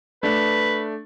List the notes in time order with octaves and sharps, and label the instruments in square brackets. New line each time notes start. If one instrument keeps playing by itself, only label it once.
[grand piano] A3 D4 [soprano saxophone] B4